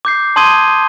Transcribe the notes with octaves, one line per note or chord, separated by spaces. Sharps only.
D6 G6 C7
A5 C6 D#6 G#6 D#7 G7